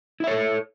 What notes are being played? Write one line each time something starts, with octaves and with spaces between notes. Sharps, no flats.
E4 A4 C#5 E5